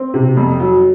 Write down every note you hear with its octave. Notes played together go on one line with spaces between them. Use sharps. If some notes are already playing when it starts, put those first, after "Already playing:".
Already playing: C4
C3
F2
F#3